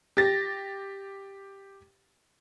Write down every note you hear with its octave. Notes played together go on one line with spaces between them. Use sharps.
G4 A6 A#6